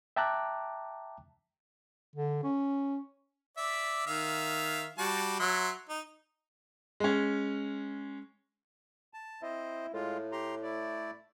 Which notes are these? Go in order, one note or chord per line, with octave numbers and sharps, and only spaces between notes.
E5 G5 A5 A#5 D6 F#6
D3
C#4
D5 E5
D#3 E5 F5
G3 F#4 A5
F#3 E5 C6
D#4
G#3 C#4
A5
C4 E4 C5 D#5
A2 G#3 F4
G4 A#5 C6
A3 E4 D5